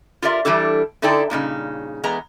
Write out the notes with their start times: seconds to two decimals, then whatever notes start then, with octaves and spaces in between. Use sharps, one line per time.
0.22 F4 G4 A#4 D5 E5
0.45 E3 G3 D4 E4 A4
1.02 D3 D#4 E4 A4 D5 G5
1.30 G2 A#2 C#3 D#4
2.04 E2 G#3 B3 A#5